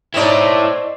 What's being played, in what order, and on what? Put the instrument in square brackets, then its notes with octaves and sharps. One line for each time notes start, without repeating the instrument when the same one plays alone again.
[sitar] C4 D#4 D5 [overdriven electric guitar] E4 C#5